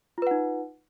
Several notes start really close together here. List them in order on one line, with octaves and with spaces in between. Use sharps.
F4 B4 F#5 D#4